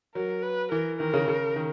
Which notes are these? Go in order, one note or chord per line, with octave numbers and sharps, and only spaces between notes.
F#3 A#4
B4
E3 A#4
D#3 A#4
C#3
C#3
D#3